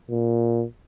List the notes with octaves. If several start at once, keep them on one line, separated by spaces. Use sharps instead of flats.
A#2